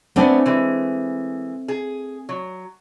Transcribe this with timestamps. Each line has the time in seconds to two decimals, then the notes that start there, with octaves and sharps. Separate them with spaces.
0.16 A3 B3 C4 D4 G#5
0.46 E3 G#3
1.68 G#4
2.29 F#3